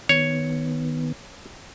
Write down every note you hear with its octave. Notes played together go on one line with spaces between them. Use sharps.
D#3 B3 C#5